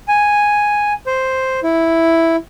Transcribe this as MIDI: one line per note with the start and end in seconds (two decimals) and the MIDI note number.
0.08 0.93 80
1.07 1.60 72
1.63 2.36 64